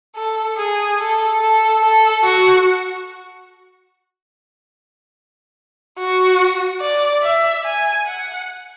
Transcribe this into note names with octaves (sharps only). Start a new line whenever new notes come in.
A4
G#4
A4
A4
A4
F#4
F#4
D5
E5
G#5
F#5